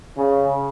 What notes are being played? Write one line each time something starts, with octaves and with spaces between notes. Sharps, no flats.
C#3